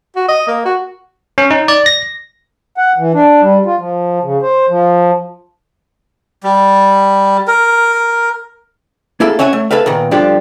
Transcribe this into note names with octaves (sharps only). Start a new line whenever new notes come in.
F#4
D#5
A#3
F#4
C#4
D#4
D5
A#6
F#5
E3
D4
G3
F4
F3
C#3
C5
F3
G3
A#4
A#3 E4 G#4 A4 E5
C#4 C#5 E5 F#5 G#5
A3
G#4 A4 B4 E5 F5
A#2 D#3 B3
G2 D3 F3 D4 F4 G4